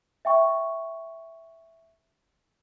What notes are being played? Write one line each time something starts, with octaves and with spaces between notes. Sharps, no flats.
E5 G5 C#6